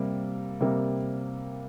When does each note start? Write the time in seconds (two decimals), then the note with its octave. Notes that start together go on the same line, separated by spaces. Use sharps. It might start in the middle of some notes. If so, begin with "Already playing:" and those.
Already playing: C3 G3 A#3
0.60 C3 G3 A#3